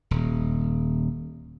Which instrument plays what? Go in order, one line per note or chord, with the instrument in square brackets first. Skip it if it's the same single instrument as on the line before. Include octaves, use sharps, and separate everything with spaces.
[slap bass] D#1